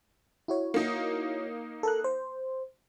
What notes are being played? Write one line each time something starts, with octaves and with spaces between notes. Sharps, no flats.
E4 F#4 C#5
A#3 D#4
A4 A#4 F#6
C5